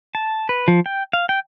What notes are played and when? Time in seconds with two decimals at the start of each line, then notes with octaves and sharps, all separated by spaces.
0.15 A5
0.49 B4
0.68 F3
0.86 G5
1.13 F5
1.29 G5